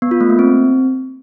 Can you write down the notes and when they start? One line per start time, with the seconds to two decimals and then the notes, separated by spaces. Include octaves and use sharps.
0.02 B3
0.11 F4
0.21 A3
0.30 A#3
0.39 C4